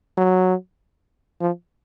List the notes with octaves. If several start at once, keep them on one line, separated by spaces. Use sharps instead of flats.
F#3
F3